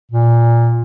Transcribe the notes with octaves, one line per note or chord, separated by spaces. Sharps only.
A#2